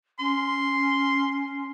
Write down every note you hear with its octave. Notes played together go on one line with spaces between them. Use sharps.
C#4 C6